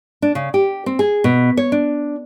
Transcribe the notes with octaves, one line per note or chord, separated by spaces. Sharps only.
D4
C#3
G4
C4
G#4
B2
C#5
D4